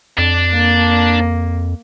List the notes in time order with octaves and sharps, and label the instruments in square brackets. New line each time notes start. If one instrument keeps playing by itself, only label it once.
[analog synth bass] F2 [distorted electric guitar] D4
[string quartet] A#3